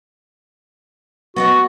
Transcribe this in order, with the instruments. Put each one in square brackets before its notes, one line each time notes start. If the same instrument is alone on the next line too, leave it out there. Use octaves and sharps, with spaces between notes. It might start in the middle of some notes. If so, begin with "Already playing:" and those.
[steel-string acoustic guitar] B3 D#5 F#5 [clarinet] F#4